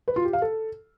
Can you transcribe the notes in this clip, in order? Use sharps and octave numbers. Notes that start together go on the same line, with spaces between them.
B4
F4
G4
F5
A4